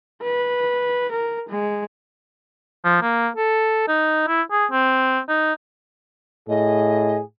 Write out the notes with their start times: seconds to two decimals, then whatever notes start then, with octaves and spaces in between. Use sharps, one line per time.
0.22 B4
1.12 A#4
1.49 G#3
2.85 F3
3.02 A#3
3.37 A4
3.88 D#4
4.27 E4
4.51 G#4
4.72 C4
5.29 D#4
6.49 A2 G#4 D#5